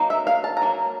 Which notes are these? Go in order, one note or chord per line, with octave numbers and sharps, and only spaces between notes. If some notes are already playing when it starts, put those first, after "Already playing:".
Already playing: F#3 A#3 D#4
E5
F5
A5
A#5
F#3 A#3